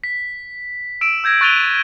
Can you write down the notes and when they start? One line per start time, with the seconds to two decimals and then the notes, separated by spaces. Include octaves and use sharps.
0.04 B6
1.01 E6 D7 E7
1.24 E6 G6 G#6 A#6
1.41 C#6 F#6 A6 D#7 F7 G7